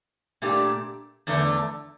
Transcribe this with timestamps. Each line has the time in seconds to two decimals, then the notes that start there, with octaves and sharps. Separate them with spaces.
0.42 A#2 A3 D4 G4
1.27 E2 D3 A3 D4